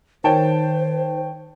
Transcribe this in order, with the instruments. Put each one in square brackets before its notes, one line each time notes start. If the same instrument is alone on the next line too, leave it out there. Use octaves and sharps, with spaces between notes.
[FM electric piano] D#3 [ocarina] C5 [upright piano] C#5 G5 A5